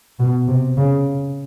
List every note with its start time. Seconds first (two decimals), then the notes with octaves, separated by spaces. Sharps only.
0.19 B2
0.47 C3
0.77 C#3